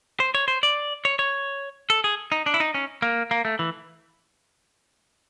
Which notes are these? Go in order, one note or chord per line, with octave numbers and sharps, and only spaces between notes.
C5
C#5
C5
D5
C#5
C#5
A4
G#4
D#4
D4
E4
D#4
C#4
A#3
A#3
A3
E3